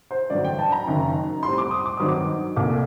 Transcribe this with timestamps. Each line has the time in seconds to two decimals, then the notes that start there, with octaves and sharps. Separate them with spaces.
0.11 C5
0.30 A1 G2 D3 F#3 D5
0.44 G5
0.59 A5
0.72 A#5
0.87 F#1 F#2 D#3
1.43 A2 G3 C4 C6
1.58 D6
1.71 D#6
1.86 D6
1.97 G2 D#3 F#3 C4 D#6
2.08 D6
2.56 C2 A#2 A3 D6